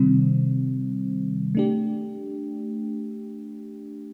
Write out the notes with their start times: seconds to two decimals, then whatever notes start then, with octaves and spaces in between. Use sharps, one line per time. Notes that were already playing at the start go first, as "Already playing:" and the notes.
Already playing: C3 D#3 G3 C4
1.55 A3 D4 G4